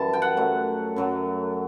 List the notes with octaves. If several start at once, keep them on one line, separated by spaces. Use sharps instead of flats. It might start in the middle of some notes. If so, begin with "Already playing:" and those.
Already playing: F#2 E3 G3 A5
G5
F#5
F#2 F#3 A3
F#2 F#3 A3